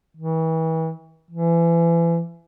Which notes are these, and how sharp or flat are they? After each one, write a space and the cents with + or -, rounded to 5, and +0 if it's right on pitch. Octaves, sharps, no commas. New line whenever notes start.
E3 -35
E3 +30